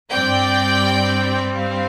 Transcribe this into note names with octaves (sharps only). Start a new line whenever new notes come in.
G2 G3 C4 D5 G5
C5 F5